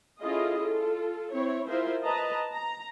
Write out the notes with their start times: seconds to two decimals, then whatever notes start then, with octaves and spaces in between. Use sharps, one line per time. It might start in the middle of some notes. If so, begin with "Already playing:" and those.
0.20 C#4 E4 F4 G#4 A4 D#5
0.59 F4 A4
1.32 C4 E4 C#5
1.68 E4 F4 G#4 A#4 C5 E5
2.03 B4 D#5 A5 A#5
2.53 A#5